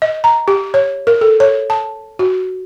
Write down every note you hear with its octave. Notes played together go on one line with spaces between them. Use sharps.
D#5
A#5
G4
C#5
A#4
A4
C#5
A5
F#4